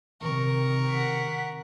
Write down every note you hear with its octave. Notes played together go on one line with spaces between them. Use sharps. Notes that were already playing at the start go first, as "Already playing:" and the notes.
C3 D#3 A#4 C#6
F#5 B6